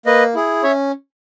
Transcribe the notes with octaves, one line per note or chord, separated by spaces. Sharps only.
A#3 B4 D#5
E4 G#4
C#4 C#5 E5